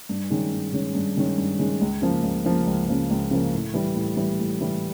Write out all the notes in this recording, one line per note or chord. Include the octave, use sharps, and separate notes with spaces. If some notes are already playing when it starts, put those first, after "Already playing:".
G2
D#3 G#3 C#4
G2
D#3 G#3 C#4
G2
D#3 G#3 C#4
G2
D#3 G#3 C#4
C#2
C#3 F3 A#3
C#2
C#3 F3 A#3
C#2
C#3 F3 A#3
C#2
C#3 F3 A#3
A2
E3 G3
A2
E3 G3
A2
E3 G3